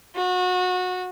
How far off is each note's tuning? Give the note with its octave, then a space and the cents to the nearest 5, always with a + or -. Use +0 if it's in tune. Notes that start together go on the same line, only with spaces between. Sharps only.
F#4 -25